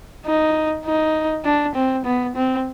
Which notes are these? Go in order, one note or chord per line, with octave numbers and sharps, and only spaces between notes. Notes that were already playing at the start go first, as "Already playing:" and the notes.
D#4
D#4
D4
C4
B3
C4